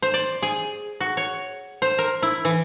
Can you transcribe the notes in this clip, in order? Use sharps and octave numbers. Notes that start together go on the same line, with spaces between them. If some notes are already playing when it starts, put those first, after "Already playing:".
C5
D5
G#4
F#4
C#5
C5
A#4
E4
E3